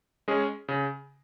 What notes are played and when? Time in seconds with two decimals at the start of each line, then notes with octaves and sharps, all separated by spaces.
0.28 G#3 C#4 G#4
0.68 C#3